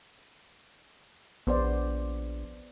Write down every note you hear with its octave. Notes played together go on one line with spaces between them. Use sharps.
A#1 B3 C5 D5